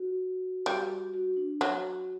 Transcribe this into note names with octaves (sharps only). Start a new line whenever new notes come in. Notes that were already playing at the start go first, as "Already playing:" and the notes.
Already playing: F#4
G3
F#4
D4
F#3 F#4